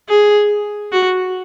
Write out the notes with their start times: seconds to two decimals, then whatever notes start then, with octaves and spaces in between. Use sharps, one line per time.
0.09 G#4
0.92 F#4